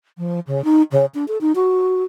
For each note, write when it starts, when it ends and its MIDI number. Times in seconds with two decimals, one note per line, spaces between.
0.18 0.40 53
0.47 0.63 49
0.64 0.82 63
0.91 1.06 49
1.14 1.25 62
1.28 1.37 69
1.41 1.52 63
1.55 2.04 66